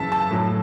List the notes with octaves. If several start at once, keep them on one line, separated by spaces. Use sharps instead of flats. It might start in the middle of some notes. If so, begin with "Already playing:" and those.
Already playing: F#2 C#3 E3 E5 A5
A5
A2 F#3